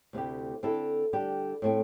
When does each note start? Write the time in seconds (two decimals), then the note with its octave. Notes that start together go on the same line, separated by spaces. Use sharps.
0.13 D2 C3 A3 E4 G4
0.63 D3 C4 E4 A4
1.13 D3 G3 D4 G4
1.62 A2 A3 C4